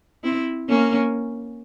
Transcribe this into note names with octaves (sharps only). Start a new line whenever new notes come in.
C4 E4
A#3 C#4